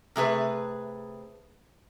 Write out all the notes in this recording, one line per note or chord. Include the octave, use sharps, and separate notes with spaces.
C3 A3 G#4 B4